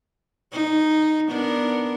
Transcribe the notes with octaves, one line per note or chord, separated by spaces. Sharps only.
D#4
B3 D4 A#4